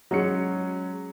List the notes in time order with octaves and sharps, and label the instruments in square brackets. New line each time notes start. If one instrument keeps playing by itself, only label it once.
[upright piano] F#3 G#3 C#4 C#7